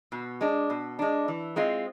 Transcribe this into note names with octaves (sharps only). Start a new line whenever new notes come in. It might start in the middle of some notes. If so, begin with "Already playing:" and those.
B2
G#3 D4
B2
G#3 D4
E3
G#3 C4 F4